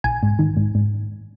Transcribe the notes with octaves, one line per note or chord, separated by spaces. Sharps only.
A#1 G#5
G#2
D#3
G#2
G#2